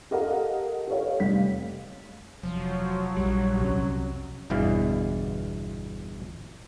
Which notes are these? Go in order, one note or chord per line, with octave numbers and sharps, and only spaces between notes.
G4 A4 A#4 D#5 F5 F#5
G4 A4 B4 C#5 D#5 F5
F1 G3 F5 B6
F1 F3 F#3
A#1 G3
C2 F2 C#4
G1 E2 B2 E3 F5